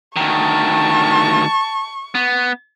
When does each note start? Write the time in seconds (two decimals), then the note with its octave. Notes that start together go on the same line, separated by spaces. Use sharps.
0.16 D2 D#3 A5 C#6
2.15 B3